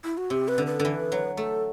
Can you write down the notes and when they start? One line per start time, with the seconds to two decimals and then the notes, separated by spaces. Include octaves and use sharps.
0.05 E4
0.18 F#4
0.30 C3 G4
0.48 B4
0.58 D3
0.67 B4
0.79 D3
0.85 E3
1.12 F#3
1.37 A3 A4